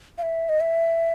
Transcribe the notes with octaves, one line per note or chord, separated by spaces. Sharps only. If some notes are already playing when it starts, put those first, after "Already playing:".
F5
E5
D#5
E5